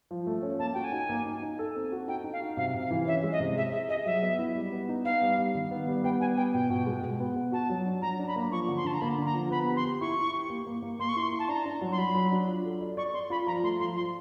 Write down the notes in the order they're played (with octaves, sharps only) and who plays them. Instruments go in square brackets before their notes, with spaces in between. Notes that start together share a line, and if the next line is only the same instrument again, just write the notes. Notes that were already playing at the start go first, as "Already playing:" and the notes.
[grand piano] F3
A3
C#4
[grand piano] A#3 [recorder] A5
[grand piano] F#4 [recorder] G5
[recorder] G#5
[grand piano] D#4
A#3
D#4
D#4
A4
C4
F#4
[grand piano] D#4 [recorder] G5
[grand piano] D#4
[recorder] F5
[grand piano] F#4
[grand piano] C3 [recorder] F5
[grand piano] C3
[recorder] F5
[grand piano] E3
[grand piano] C#4 [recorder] E5
[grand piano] G#3
[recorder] D#5
[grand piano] C3
[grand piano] G#4 [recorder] E5
[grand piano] G#4 [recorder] E5
[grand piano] G#4 [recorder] D#5
[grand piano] F#3 [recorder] E5
[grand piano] B3
E4
G3
B3
D#4
[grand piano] B3 [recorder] F5
[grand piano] G3
G3
D#3
B3
G3
[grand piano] B3 [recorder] G5
[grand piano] G3 [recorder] G#5
[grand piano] B3 [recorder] G5
[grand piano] B2 [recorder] G5
[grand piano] B2
G#3
B2
B3
B3
[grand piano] F#4 [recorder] A5
[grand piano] F#3
D4
[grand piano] F#3 [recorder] A#5
[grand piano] D4 [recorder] A#5
[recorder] B5
[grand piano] A#3
[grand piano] F3 [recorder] C#6
[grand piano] D3
[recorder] C6
[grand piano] D3 [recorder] A5
[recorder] A#5
[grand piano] A#3 [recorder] B5
[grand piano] D3
[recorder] A#5
[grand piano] F3
[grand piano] B3 [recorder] B5
[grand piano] G4
[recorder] C6
[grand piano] G4
[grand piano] E4 [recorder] C#6
[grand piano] E4
G4
A#3
A#3
A#3
[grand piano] A#3 [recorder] C6
[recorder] C#6
[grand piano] E4 [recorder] C6
[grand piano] E4
[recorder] A5
[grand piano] D4 [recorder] A#5
[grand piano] D4
F#3
[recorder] C6
[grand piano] F#3 [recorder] B5
[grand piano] F#3
D4
F4
A4
D5
[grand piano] D5 [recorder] C#6
[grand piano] D5 [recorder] C6
[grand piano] F4 [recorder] B5
[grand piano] F3 [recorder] A#5
[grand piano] A3 [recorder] C6
[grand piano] F3 [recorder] C6
[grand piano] F3 [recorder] C6